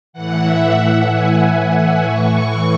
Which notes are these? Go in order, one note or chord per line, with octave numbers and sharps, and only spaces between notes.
A2 E3 F#5
E5
F#5
G#5
A2 E3 C#6